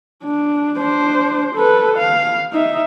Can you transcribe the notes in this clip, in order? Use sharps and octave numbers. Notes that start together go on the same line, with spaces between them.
D4
D4 C5
A4 B4
F5
D#4 E5